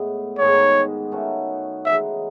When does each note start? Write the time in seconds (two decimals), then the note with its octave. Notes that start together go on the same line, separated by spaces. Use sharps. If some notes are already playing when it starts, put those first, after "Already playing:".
Already playing: A2 G#3 B3
0.38 G#2 D#3 G#3 B3 C#5
1.12 D#3 A3 C#4 F#4
1.85 C#3 E3 G#3 D#4 E5